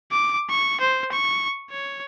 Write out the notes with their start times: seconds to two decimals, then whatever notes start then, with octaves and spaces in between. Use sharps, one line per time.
0.12 D6
0.50 C#6
0.80 C5
1.12 C#6
1.70 C#5